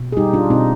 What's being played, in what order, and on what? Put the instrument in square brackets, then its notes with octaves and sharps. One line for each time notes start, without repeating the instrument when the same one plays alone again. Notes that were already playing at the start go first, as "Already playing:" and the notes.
Already playing: [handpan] B2
G#4
G3 D#4 G4
D4 F4
B2 C4 D#4